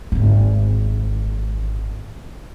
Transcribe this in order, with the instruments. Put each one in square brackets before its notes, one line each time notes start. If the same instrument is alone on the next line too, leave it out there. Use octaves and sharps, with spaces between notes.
[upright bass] D#1 G#1